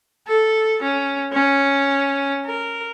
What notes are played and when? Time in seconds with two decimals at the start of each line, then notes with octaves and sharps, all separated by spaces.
0.27 A4
0.82 C#4
1.33 C#4
2.45 A#4